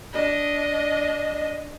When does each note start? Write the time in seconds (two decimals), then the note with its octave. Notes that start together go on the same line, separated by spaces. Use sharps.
0.13 D4 D#5